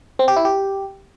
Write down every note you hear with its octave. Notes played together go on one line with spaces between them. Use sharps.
C4
G4
E4
G4